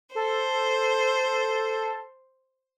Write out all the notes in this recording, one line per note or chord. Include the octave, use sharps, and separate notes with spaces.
A4 C5